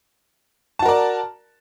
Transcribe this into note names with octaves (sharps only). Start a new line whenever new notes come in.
F#4 A#4 D5 A5